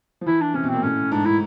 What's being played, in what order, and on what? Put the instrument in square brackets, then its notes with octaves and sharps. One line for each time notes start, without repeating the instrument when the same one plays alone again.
[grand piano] F3
[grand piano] E3 [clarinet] E4
[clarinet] D4
[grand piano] C3 [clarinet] C#4
[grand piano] B2
[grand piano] A#2 [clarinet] C4
[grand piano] A2 [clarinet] C#4
[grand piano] G#2 [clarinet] D4
[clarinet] E4